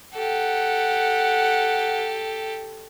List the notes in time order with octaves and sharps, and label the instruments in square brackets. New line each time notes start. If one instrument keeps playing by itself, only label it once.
[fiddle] G4 A4 [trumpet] F#5